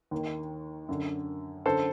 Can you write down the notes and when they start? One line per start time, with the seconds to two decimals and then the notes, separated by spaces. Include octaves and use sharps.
0.11 D#2 D#3
0.89 F#2 D3
1.65 F#2 D3 A4 C5